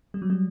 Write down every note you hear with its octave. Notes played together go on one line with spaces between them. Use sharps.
G3
F#3
G3